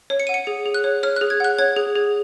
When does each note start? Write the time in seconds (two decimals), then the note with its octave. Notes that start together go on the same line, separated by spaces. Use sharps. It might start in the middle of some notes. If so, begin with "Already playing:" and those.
0.10 C#5
0.20 C#7
0.27 F#5 D#7
0.34 C#7
0.47 G#4
0.66 G#4
0.74 F#6
0.84 C#5
1.03 C#5 F6
1.16 F#6
1.21 G#4
1.30 G#6
1.40 F#5 F#6
1.59 C#5 G#6
1.76 G#4
1.95 G#4